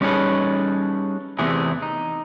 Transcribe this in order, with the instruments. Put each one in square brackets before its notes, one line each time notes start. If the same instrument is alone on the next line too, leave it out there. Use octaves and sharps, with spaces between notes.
[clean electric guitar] G3 C#4 D#4 G#4 A4 B4
E2 C3 E3 A3 G#4
D#4